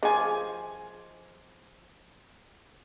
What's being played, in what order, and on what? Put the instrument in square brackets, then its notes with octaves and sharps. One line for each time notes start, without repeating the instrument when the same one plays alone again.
[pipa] F3 G#5 [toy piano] G#4 D#5